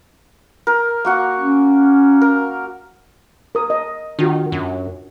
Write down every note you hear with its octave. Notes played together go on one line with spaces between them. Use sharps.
A#4
A#3 F#4 F#5
C#4
A#4
A#4 D#6
D#5
D#3 D4 F4 F#4
F#2